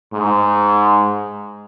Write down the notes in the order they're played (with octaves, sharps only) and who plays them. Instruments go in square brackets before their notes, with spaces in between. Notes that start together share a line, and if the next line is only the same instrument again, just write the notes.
[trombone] G#2